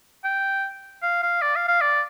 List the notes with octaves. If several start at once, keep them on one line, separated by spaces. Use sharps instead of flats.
G5
F5
F5
D5
F5
F5
D5